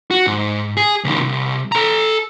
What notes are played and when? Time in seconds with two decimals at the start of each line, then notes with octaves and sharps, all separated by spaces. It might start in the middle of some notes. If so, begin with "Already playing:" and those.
0.11 F#4
0.27 G#2
0.77 G#4
1.04 C#2 D#3
1.20 C2
1.72 A4 A#5